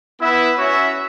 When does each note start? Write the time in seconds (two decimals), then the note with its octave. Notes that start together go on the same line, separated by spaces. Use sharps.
0.21 B3 E4 B4 E5
0.58 C#4 F#4 C#5 E5